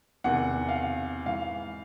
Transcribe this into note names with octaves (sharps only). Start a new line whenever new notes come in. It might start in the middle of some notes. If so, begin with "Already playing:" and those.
E2 C3 D#3 F#5
F5
F#5
G#2 E3 F5